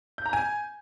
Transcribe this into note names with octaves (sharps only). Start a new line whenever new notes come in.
G6
A#5
G#5